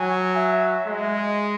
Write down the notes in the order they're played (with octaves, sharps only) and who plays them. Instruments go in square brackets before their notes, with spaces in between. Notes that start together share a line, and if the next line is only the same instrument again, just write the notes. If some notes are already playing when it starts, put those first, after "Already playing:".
Already playing: [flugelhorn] F#3 [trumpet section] G#5
[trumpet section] E5
[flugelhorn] G#3 [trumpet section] D#5